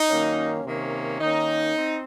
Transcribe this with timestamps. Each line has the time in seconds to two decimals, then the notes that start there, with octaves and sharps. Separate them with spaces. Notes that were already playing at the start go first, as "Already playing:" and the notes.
Already playing: D#4
0.10 F#2 D#3 A#3 C#4
0.65 C3 D#3 A#3 C#4
1.21 D#3 A#3 C#4 D#4
1.76 C4